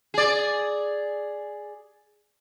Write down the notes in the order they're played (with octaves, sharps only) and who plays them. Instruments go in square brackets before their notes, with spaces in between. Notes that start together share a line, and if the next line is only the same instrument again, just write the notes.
[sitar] G#4 D5